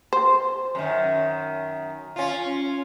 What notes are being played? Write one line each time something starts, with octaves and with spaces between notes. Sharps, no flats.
C5
F#2 D#3
C#4 F4